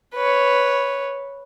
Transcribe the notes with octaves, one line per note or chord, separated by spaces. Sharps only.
B4 C#5